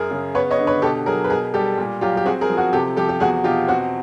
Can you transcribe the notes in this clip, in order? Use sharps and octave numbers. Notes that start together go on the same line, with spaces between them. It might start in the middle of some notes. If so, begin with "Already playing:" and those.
Already playing: F#2 G#4 A#4
C#3
B3 B4 C#5
C#5 D#5
D3
B4 C#5
B2 G4 A4
F#3 G#4 A#4
B4
B2 G#4 A#4
G3 G4 A4
A#2
F#3 F4 G4
G4
C4 F#4 G#4
G#4 A#4
F3
F#4 G#4
C3 G4 A4
F3 G4 A4
G4
E2 F#4 G#4
B2 F4 G4
C4 F#4